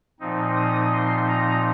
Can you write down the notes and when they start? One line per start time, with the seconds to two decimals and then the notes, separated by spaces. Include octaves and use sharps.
0.20 A#2 F3 C4 D#4
0.56 D#6
0.93 C6
1.29 A#5